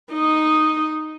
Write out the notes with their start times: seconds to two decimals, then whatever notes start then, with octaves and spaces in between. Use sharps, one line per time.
0.12 D#4 D#5